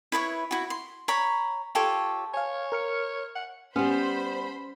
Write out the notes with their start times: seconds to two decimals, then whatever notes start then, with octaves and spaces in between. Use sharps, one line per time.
0.12 E4 B4 C#5 C#6
0.51 E4 F#4
0.70 C6
1.08 C#5 A#5 B5
1.75 F4 G4 A4 C#5
2.33 C#5 F5 G#5
2.72 A#4 F6 C#7
3.35 F#5
3.76 G3 B3 C#4 C5 B5